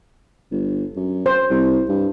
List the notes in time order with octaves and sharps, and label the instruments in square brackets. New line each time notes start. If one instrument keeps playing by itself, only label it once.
[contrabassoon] G1
F#2
[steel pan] C5
[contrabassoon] C2
G2